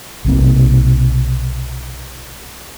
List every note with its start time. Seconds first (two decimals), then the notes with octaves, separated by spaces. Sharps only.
0.25 B1 C3 A#3